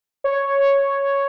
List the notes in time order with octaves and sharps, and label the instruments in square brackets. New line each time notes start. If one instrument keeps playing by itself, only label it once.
[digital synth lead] C#5